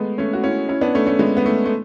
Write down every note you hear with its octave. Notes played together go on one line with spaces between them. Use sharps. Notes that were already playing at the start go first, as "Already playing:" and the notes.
Already playing: G#3 A3 B3
A3 C#4
F#4
C#4 E4
C#4 E4
B3 D4
A3 C#4
A3 C#4
G#3 B3
B3
A3
A3